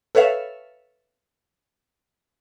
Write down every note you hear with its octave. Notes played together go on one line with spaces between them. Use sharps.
A4 B4 C#5 E5 F5